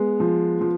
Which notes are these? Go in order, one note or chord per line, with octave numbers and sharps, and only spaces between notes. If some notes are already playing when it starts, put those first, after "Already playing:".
Already playing: G#3 B3
F3
F3